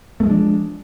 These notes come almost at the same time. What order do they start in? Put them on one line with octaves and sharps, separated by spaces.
A3 G#3 F3 D4